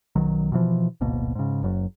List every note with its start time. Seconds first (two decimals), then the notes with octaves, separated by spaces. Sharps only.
0.16 B1 D#3 F#3
0.52 B2 D3 E3 F3
1.01 D1 G#1 B2 A#3
1.35 G#2 C#3
1.62 F#1 F#2